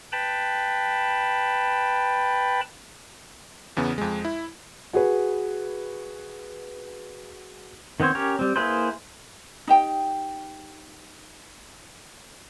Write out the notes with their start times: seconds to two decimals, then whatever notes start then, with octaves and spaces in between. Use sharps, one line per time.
0.13 B4 G5 A5 B5
3.77 E2 C#3 B3
3.98 F2 G#3
4.25 E4
4.93 F#4 G#4 B4
8.00 D#3 B3 C4 C5 C#5
8.15 C#4 G4 A#4 C#5
8.39 G3 C4
8.56 A#3 E4 G#4 B4 C5
9.67 D#4 G4 G5